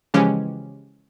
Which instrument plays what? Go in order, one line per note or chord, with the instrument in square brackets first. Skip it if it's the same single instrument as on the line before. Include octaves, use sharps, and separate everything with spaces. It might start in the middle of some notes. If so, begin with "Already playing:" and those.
[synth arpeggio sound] C#3 E3 F3 G#3 C#4 G4